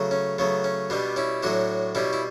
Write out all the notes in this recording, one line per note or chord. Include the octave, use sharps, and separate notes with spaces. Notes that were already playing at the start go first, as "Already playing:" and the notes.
Already playing: C#3 F#3 A3
C#4
C#3 F#3 A3 B3
C#4
B2 G3 B3 D4
C#4 E4
A2 F#3 A3 D4 F#4
B2 G3 C#4 E4
E4